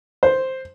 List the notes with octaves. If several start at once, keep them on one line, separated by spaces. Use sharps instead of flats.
C5